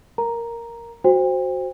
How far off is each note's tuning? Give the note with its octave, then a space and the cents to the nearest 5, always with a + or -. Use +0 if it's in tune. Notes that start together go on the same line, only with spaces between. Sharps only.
A#4 +0 A#5 +0
F#4 +0 C5 +0 G5 +35